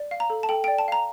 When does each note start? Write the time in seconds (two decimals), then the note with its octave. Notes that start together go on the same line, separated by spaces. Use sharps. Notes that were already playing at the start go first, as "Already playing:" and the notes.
Already playing: D5
0.11 F5
0.20 A#5
0.30 A4
0.43 A5
0.49 A4 G5
0.64 G5
0.68 D5
0.78 A5
0.88 F5 A#5